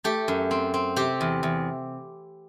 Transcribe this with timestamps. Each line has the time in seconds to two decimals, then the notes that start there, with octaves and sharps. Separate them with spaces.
0.04 A3 G4
0.28 F#2
0.51 C4
0.74 C4
0.96 C3 G4
1.21 E2
1.43 E2